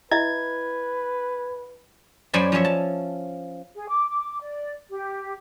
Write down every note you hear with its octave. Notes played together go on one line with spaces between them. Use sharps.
E4 B4 D#5 E5 G#6
F#2 C5 D5 G#5 B5
F3 C#4 C#5 E5
A5
G#4
D6
D6
D5
G4